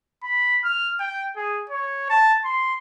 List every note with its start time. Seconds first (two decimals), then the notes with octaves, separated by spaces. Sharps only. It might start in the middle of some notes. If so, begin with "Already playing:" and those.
0.23 B5
0.64 F6
1.00 G5
1.37 G#4
1.70 C#5
2.10 A5
2.45 C6